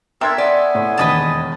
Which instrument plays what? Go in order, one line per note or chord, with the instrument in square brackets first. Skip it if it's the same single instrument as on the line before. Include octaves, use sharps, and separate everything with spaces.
[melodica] D4 A4 A#4 [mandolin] E5 [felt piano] G5 C6 G#6
[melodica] B3 G#5 [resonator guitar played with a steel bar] D5
[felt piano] A2
[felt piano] E1 D#2 D#3 [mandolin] B4 D#5 A5